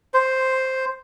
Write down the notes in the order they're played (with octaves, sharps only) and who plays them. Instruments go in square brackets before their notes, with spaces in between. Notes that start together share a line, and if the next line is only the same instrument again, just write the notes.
[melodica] C5